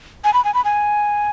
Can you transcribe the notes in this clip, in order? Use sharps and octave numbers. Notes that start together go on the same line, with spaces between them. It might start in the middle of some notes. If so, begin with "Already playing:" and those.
G#5
B5
G#5
B5
G#5